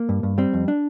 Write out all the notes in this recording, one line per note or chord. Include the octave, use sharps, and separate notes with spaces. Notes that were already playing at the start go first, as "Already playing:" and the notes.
Already playing: A#3
G2
G2
G3 C4
F2
D4